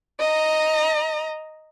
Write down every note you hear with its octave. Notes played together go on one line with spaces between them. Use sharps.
D#5 A#5